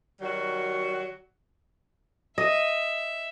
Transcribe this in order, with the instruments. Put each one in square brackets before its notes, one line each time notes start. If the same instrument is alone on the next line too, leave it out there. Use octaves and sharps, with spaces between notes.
[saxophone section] D#3 F#3 G3 F#4
[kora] D#5 [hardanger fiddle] E5